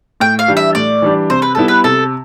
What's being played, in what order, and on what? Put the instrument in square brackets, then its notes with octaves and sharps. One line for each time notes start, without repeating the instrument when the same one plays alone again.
[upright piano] A2 [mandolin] G5
[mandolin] F5
[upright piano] E3 G3 D4 G4
[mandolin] E5
[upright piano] A2 [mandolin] D5
[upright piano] E3 G3 D4 G4
[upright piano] C3 [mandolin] C5
[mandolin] B4
[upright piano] G3 B3 E4 [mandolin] A4
[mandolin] B4
[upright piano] C3 [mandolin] A4